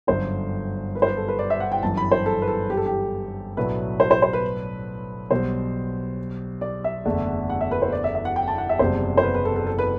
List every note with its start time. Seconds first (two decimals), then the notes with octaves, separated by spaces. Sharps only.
0.07 G1 F#2 D3 C5
0.95 B4
1.02 C5
1.07 B4
1.17 A4
1.28 B4
1.39 D5
1.50 E5
1.60 F#5
1.72 G5
1.82 G1 F#2 E3 A5
1.97 B5
2.11 C5
2.26 A4
2.42 B4
2.48 A4
2.70 G4
2.77 A4
2.86 G4
3.57 B1 A2 F#3 A3 D4 B4
4.00 C5
4.11 C5
4.22 C5
4.33 B4
5.31 B1 B2 G3 C5
6.61 D5
6.84 E5
7.05 F#1 E2 D3 A3 D4
7.50 F#5
7.61 E5
7.71 B4
7.82 C5
7.92 D5
8.04 E5
8.15 E5
8.25 F#5
8.36 G5
8.48 A5
8.58 F#5
8.69 E5
8.79 F#1 E2 C3 G3 D4 C5
9.17 C5
9.23 B4
9.34 B4
9.45 A4
9.56 A4
9.67 A4
9.78 B4